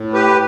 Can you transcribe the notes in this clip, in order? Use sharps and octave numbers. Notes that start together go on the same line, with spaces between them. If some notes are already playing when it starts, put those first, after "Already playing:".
Already playing: A2
G4 B4